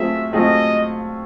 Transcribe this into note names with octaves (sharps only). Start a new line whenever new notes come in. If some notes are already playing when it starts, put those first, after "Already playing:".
Already playing: F#3 A3 C4 F4 G#4 E5
F#3 A3 C4 F4 G#4 D#5